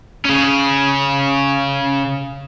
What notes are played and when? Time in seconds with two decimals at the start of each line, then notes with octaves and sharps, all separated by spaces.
0.25 C#3 C#4